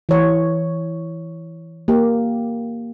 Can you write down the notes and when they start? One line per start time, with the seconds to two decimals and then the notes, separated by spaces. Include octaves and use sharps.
0.09 E3 C#5
1.88 A#3 G4